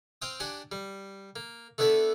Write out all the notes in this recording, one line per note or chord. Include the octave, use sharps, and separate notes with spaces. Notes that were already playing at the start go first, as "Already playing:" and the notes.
C4 F5 G5 D#6
D4 G4 F#5 G#5
G3
A#3
A3 B3 D4 E4 A4 B4